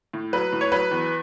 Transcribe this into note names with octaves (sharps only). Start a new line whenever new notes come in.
A2
F#3 B4
A2
C#5
F#3 B4
E2